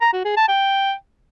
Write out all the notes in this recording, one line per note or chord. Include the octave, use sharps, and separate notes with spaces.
A#5
F#4
G#4
A5
G5